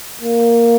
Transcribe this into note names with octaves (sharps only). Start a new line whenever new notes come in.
A#3